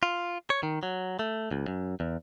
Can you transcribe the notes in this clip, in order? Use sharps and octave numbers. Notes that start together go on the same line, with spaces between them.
F4
C#5
D#3
F#3
A3
C#2
F#2
E2